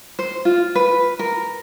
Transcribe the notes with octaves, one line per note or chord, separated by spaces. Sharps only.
C5
F4
B4
A#4